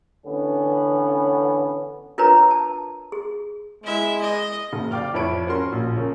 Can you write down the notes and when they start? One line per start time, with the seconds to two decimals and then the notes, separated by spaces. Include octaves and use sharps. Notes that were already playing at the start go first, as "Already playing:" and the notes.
0.25 A1 D3 B3 C#4
2.18 D4 F4 A#4 B4 C#5 A#5
2.51 A5
3.12 G#4
3.84 G#3 E4 E5
4.21 D#5
4.73 F#1
4.91 D5 F5 G5 D6 F6
5.14 F2 E4 C#5 B5 D7
5.47 C#4 F#4 A#4 C6
5.72 A#1
5.97 C#3 A#3